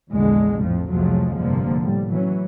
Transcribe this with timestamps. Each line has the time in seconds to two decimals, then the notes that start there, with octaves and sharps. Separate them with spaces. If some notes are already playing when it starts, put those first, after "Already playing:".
0.11 A#1 E2 D3 G#3
0.60 F2 A2 F3
0.90 C2 F2 F3 F#3 G#3 A3
1.37 F1 G2 D3 F3 A#3
1.79 A2 G3
2.11 E3 F#3 C#4